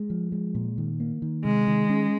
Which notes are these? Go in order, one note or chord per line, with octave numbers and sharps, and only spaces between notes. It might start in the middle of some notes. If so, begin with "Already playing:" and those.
Already playing: G#3
F3
G#3
A#2
D#3
A#3
D#3
C3 G#3
D#3
C#4